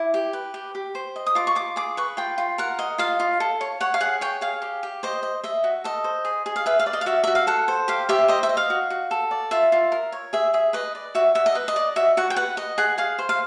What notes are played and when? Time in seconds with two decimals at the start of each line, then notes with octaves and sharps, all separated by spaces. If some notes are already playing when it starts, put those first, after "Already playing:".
Already playing: E4 D6
0.14 G4
0.33 B4
0.54 G4
0.75 G4
0.95 C5
1.16 D#5
1.26 D#6
1.35 F4 D6
1.47 C#6
1.55 F4 D6
1.76 G#4 D6
1.97 B4 C#6
2.17 F4 G5
2.38 F4
2.58 A#4 F#5
2.79 D#5
2.98 F4 F5
3.20 F4
3.40 A4
3.61 C#5
3.81 C#5 F#5
3.94 F5
4.00 G#4 F#5
4.21 C#5 G5
4.41 G#4 F5
4.62 G4
4.83 G4
5.03 C5 D#5
5.23 D#5
5.44 D#5 E5
5.64 F#4
5.84 A4 D#5
6.04 C5
6.25 G#4
6.46 G#4
6.56 F5
6.66 B4 E5
6.79 F5
6.86 D5
6.93 D#5
7.01 F5
7.06 F#4 E5
7.24 F#4 E5
7.35 F5
7.47 A4 F#5
7.68 C5
7.88 G4 F5
8.09 G4 E5
8.28 C5 D#5
8.43 E5
8.49 D#5
8.57 F5
8.70 F#4
8.90 F#4
9.11 A4
9.31 D5
9.51 F4 E5
9.72 F4
9.92 A#4
10.12 C#5
10.33 G#4 E5
10.53 G#4 E5
10.73 B4 D#5
10.95 D5
11.15 F#4 E5
11.35 F#4 E5
11.46 D#5
11.55 B4
11.68 D#5
11.76 D5
11.96 F#4 E5
12.17 F#4 F#5
12.30 G5
12.36 B4 F#5
12.57 D#5
12.78 G#4 F#5
12.98 G#4 F5
13.19 C5
13.29 F5